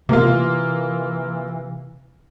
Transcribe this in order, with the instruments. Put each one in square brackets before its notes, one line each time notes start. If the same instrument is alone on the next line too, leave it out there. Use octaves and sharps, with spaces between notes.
[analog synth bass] C3 [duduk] E3 [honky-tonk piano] A#3 F4